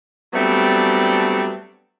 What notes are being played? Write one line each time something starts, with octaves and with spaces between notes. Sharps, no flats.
F#3 G3 A3 B3 C4 D4